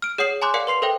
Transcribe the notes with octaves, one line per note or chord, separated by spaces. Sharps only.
F6 D7
G#4 C#5 F#5 D#6 C7 F#7
G#5 A#5 C6 D6 F#6 G6
A#4 D5 F5 F#5 C#7
B4 C6 C7 F7
A4 A#4 C5 E5 G5